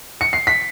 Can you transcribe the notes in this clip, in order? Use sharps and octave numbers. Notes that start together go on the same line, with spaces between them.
C#7
C7
B6